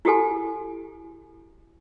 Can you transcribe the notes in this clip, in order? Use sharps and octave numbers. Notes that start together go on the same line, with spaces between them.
E4 F#4 G4 A4 G#5